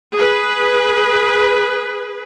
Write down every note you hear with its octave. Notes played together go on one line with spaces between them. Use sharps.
G#4 B4